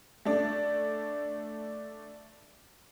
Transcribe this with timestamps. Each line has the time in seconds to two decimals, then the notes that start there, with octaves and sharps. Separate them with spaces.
0.25 A3 D4